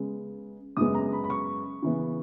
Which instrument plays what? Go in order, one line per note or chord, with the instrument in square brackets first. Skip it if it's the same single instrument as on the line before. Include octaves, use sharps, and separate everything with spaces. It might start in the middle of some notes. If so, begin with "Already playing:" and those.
Already playing: [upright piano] C#3 G#3 B3
F#2 C#3 G#3 B3 D#6
A#5
B5
B5
C#6
C#3 E3 B3